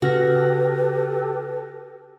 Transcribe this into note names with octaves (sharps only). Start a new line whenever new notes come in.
C#3 F#4 G4 A4 B4 F6 A#6